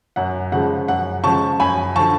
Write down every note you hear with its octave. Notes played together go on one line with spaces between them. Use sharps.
F#2 F#5
C#3 F3 G#3 F#5
F#2 F#5
C#3 F3 G#3 A5 C#6
F#2 G#5 B5
D3 F3 A5 C#6